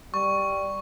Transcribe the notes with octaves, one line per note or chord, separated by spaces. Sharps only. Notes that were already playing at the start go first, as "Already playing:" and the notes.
G3 C#6